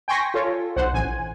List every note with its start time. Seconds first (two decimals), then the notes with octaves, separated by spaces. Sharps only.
0.08 G5 G#5 C6 C#6 A#6 B6
0.34 F4 A4 C#5
0.76 B1 C5 F#5
0.93 A1 G#5